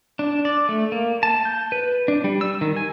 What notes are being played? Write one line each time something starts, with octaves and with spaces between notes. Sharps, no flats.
D4
D5
A3
A#3
A5
G6
B4
D4
G3
E6
D#3
G#5